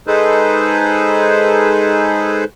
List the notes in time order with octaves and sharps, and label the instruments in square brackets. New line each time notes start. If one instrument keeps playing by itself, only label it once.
[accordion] G#3 D#4 G#4 A4 B4 C5